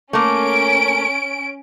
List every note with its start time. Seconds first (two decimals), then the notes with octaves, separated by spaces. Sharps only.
0.13 A3 A#3 C#4 D7